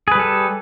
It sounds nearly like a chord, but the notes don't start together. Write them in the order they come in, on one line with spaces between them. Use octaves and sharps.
G#4 B4 G3 A4